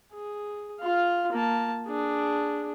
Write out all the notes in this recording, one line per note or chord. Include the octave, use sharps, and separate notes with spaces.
G#4
F4 F5
A#3 A5
D4 G#4